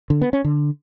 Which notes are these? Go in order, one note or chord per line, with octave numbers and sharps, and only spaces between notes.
D3
B3
C#4
D3